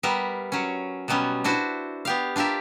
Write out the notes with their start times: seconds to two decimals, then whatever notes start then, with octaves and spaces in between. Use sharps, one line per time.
0.03 G3 B3 A#4 E5
0.52 F#3 C#4
1.08 B2 F#3 G3 B3 C#4
1.44 D4 E4 F#4 B4 C5
2.05 B3 G4 F5
2.36 D4 F4 G4 A#4 E5